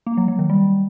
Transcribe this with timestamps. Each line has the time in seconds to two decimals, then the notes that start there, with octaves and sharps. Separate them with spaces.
0.07 A#3
0.17 F#3
0.28 F#3
0.39 D#3
0.50 G3